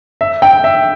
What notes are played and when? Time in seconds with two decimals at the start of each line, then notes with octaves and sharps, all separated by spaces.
0.21 E5
0.42 G5
0.64 E5